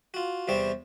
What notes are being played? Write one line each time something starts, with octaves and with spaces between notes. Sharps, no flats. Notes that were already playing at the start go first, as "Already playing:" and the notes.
F4 F#4
E2 C3 G3 C4 G4 C#6